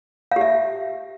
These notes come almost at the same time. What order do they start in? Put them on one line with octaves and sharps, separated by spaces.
F5 G4 E5